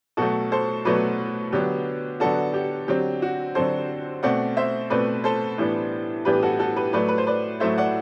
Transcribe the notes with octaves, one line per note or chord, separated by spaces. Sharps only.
B2 F#3 A3 F#4 A4
A4 C5
B2 F#3 A3 B4 D5
D3 F#3 B3 D4 G4
D3 F#3 B3 D4 F#4 A4
G4
D3 F#3 C4 G4
F#4
D3 F#3 C4 A4 C5
B2 A3 C4 D5 F#5
C5 E5
B2 A3 C4 B4 D5
A4 C5
A2 E3 G3 B3 D4
A2 E3 G3 B3 D4 G4 B4
F#4 A4
F#4 A4
G4 B4
A2 F#3 A3 B4 D5
B4
C5
B4 D5
A2 F#3 A3 C5 E5
D5 F#5